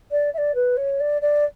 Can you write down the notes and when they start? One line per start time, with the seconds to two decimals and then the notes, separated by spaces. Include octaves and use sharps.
0.11 D5
0.34 E5
0.38 D5
0.55 B4
0.77 C#5
1.00 D5
1.22 D5